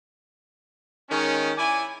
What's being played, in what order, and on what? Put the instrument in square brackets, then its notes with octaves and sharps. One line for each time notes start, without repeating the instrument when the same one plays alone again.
[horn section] D#3 G#3 C#4
E4 D5 G#5